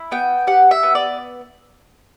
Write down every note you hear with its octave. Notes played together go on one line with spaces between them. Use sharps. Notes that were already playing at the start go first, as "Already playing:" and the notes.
Already playing: E4
B3 G5
G4 F#5
E5
B3
D5